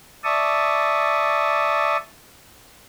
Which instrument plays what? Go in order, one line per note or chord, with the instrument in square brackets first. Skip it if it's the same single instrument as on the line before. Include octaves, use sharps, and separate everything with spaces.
[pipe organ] D5 E5 A5 C#6 D#6